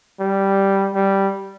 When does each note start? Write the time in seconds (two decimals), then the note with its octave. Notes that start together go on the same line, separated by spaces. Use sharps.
0.19 G3
0.94 G3